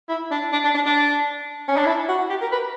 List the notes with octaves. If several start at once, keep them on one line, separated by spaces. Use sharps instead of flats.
E4
D4
D4
D4
D4
D4
C#4
D4
E4
F#4
G4
A#4
B4